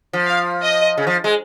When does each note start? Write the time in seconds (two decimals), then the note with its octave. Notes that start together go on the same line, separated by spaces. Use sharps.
0.13 F3
0.26 F5
0.62 D#5
0.98 C#3
1.07 F3
1.24 G#3